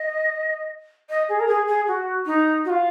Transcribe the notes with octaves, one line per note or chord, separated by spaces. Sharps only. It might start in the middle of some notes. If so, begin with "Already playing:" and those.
Already playing: D#5
D#5
G#4
A#4
G#4
G#4
F#4
D#4
F#4
F4